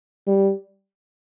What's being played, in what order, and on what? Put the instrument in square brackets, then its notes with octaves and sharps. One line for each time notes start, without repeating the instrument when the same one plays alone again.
[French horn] G3